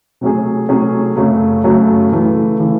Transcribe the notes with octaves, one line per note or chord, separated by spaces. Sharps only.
C3 F#3 A3 C#4 G#4
C3 F#3 A3 C#4 G#4
F#2 C#3 F#3 A3
F#2 C#3 F#3 A3
C#3 E3 A3
C#3 E3 A3